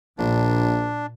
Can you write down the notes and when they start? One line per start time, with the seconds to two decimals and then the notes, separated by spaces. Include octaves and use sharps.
0.18 A#1 A#2 D4